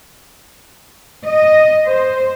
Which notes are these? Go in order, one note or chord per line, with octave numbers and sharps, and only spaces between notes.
D#5
C5